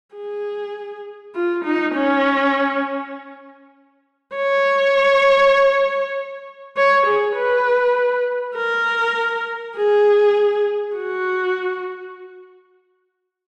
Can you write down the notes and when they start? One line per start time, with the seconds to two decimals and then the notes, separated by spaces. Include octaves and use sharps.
0.15 G#4
1.35 F4
1.65 D#4
1.95 C#4
4.35 C#5
6.77 C#5
7.06 G#4
7.37 B4
8.57 A#4
9.77 G#4
10.96 F#4